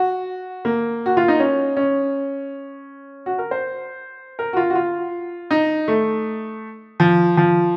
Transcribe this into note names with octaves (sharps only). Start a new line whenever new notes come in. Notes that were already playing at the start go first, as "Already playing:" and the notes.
Already playing: F#4
A#3
F#4
F4
D#4
C#4
C#4
F#4
A#4
C5
A#4
F#4
F4
F#4
F4
D#4
A3
F3
F3